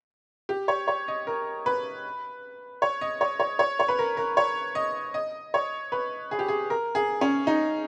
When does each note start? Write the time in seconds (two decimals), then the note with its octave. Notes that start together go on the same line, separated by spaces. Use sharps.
0.49 G4
0.68 C#5
0.88 C#5
1.08 D#5
1.27 A#4
1.66 B4
2.82 C#5
3.01 D#5
3.21 C#5
3.40 C#5
3.59 C#5
3.80 C#5
3.88 B4
3.99 A#4
4.17 A#4
4.37 C#5
4.75 D#5
5.14 D#5
5.54 C#5
5.92 B4
6.31 G#4
6.39 G4
6.48 G#4
6.70 A#4
6.95 G#4
7.21 C#4
7.47 D#4